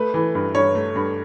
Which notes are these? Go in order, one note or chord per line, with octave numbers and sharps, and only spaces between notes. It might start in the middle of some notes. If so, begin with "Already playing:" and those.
Already playing: A3 B4
E3
G2
G2 C#5
A3
G2